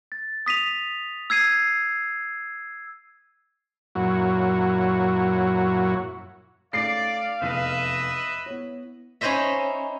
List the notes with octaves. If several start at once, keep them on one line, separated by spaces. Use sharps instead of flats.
A6
D#6 B6 D#7 F7
E6 G#6 C7 D#7
F#2 A#2 F#3 E4 F#4 C#5
A3 C#4 D#4 D5 F5 C7
F1 E2 B4 D#5 E5
B3 E4 C#5
C#4 D#4 E4 C5 D#5 E5